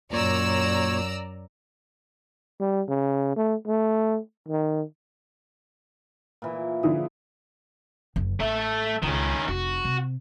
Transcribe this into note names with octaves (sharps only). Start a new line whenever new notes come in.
F#2 A#2 C#5 D5 A#5 E6
G3
C#3
A3
A3
D#3
A#2 E3
D3 F3 E4 G#4
F#1 D2
A1 A3 E5
C#2 D#3 C#4
F1 F#4
C3